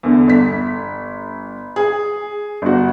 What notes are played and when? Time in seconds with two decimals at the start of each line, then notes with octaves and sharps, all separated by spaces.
0.03 E2 D3
0.28 G1 B6
1.76 G#4
2.62 G1 F#4